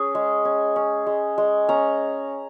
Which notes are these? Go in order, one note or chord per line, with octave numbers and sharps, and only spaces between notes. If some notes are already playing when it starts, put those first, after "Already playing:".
Already playing: C#4 G#4
G#3
C#4
C#4
G#3
G#3
C#4 A#5